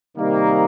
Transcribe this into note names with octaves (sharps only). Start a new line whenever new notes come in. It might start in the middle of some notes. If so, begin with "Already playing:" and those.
C3 D#3 G3 A#3 D#4